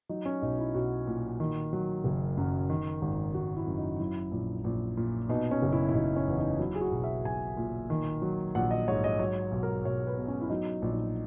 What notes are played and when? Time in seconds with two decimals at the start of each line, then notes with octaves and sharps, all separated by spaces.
0.09 F#3 D#4
0.26 C#4
0.42 B1 D#4
0.59 E4
0.74 B1 F#4
1.07 A#2
1.40 D#3
1.73 F#3
2.04 F#1
2.37 F#2
2.70 D#3
3.02 G#1
3.34 G#1 F#4
3.56 E4
3.67 F#2
3.78 D#4
4.00 F#3 E4
4.32 A#1
4.64 A#1
4.97 A#2
5.29 B2 D#4
5.51 C#4
5.62 F#1
5.72 E4
5.89 E4
5.94 F#1 D#4
6.16 C#4
6.28 E2
6.39 D#4
6.59 F#3 E4
6.75 G#4
6.81 F#4
6.92 B1
7.04 E5
7.24 B1 G#5
7.57 A#2
7.90 D#3
8.22 F#3
8.55 A#1 F#5
8.71 D#5
8.88 G#2 C#5
9.04 D#5
9.19 F#3 C#5
9.52 B1
9.63 A#4
9.85 B1 C#5
10.07 B4
10.18 B2
10.28 C#4
10.41 E4
10.49 F#3 D#4
10.82 A#1
10.93 D#4